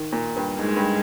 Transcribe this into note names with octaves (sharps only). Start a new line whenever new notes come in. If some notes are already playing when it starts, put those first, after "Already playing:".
Already playing: D#3
A#2
G2
G#2 G#3
G2